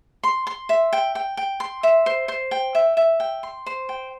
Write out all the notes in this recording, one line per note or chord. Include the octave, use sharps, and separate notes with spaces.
C6
C6
E5
G5
G5
G5
C6
E5
C5
C5
G5
E5
E5
G5
C6
C5
G5